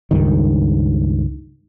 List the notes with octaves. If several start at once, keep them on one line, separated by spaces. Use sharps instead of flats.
C#2 G2 D#3